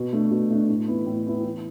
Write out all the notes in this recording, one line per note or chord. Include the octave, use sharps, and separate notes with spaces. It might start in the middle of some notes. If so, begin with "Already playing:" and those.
Already playing: B2
A3 D4
B2
A3 D4
A2
E3 B3 E4
A2
E3 B3 E4
E3